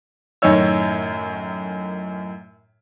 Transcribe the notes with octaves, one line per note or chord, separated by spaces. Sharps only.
F#2 A2 D#3 D#4 C#5 E6